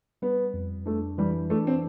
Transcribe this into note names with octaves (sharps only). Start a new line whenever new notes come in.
G3 B3
F2
A3 D4
E3 G3
A3 D4
C4